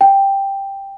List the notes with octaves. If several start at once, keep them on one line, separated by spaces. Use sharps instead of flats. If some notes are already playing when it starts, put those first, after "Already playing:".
G5